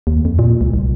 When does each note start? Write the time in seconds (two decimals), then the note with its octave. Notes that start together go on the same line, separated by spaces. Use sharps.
0.07 D#2
0.25 F2
0.39 A#2
0.61 C#2
0.74 C2